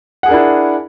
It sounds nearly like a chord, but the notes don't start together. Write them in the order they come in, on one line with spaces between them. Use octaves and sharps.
F#5 G#4 A#4 D4 E4